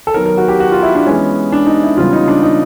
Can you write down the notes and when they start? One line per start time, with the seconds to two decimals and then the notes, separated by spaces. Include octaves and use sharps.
0.07 A4
0.14 D#3 F#3 B3 A#4
0.26 A#4
0.37 F#4
0.48 G4
0.60 F#4
0.72 F4
0.83 E4
0.95 D4
1.06 E3 G#3 B3 C#4
1.52 D4
1.67 D#4
1.83 E4
1.97 C#3 E3 G3 B3 F4
2.13 D#4
2.28 D4
2.43 D#4